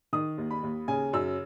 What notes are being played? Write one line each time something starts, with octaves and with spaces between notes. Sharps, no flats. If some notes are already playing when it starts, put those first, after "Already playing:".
D#3 D#6
D#2
B5
D#2
C#3 G#5
F#2 E6